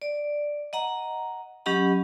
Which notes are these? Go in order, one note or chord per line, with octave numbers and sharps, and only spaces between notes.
D5
D#5 F#5 A#5
F#3 C#4 G4 D#5 F#5 B5